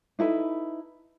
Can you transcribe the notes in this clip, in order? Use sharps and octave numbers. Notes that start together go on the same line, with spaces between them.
D#4 E4 A4 B4